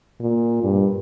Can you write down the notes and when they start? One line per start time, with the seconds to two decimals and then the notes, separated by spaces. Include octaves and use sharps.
0.20 A#2
0.63 G2